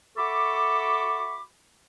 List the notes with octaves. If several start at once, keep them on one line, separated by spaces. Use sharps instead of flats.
F#4 A4 E5 B5 C#6 D6